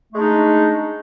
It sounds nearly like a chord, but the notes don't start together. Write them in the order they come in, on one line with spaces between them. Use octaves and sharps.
A3 G#3 D4 D#4